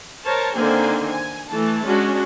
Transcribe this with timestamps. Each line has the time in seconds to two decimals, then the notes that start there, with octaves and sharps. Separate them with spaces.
0.25 A#4 C5 C#5 A5
0.55 D3 D#3 A#3 C4 C5 G#5
1.09 G#5
1.50 E3 A3 A5
1.86 G#3 C#4 D4 F#4